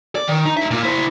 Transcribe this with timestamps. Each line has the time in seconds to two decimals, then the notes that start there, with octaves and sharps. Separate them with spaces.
0.15 D5
0.28 D#3
0.45 D#4
0.57 D#4 E5
0.71 A#2 F4
0.83 E4 C5